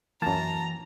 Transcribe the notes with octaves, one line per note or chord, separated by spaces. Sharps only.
F#2 E3 A#3 A5 A#5